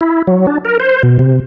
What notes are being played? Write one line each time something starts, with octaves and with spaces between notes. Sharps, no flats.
E4
F#3
D4
A#4
C5
B2
C3